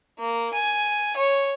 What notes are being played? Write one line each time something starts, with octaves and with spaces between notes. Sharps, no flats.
A#3
G#5
C#5